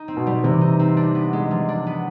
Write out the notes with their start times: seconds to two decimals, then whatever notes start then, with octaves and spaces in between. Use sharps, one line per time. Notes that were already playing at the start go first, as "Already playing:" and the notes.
Already playing: D#4
0.08 C4
0.17 B2
0.27 G3
0.44 C3 E3
0.61 D#4
0.79 C4
0.97 D4
1.15 B3
1.33 G#3
1.51 F3
1.69 D4
1.87 B3